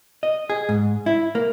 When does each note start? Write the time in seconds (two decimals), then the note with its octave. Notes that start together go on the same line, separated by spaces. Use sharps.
0.23 D#5
0.50 G#4
0.69 G#2
1.06 E4
1.35 A#3